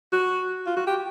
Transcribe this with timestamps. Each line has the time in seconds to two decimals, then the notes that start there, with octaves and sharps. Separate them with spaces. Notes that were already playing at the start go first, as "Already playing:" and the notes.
0.13 F#4
0.67 F4
0.76 F#4
0.87 G4